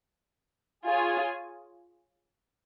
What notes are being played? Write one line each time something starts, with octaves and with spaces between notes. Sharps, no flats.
F4 G#4 C#5 G#5